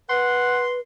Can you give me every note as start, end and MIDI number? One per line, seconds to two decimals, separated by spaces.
0.09 0.80 71
0.09 0.64 78
0.09 0.74 84